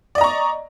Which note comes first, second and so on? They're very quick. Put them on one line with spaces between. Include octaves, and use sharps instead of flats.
D5 D#5 A#5 C#6